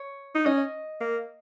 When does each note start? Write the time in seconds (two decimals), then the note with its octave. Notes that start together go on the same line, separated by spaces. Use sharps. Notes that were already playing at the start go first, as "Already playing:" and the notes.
Already playing: C#5
0.35 D#4
0.46 C#4 D#5
1.01 A#3